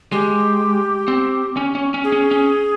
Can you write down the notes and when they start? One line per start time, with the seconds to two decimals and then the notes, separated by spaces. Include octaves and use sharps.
0.12 G#3 G4
1.08 C4
1.57 C#4
1.75 C#4
1.94 C#4
2.04 G#4
2.12 C#4
2.31 C#4